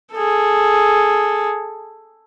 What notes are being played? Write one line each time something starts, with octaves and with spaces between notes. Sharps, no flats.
G#4 A4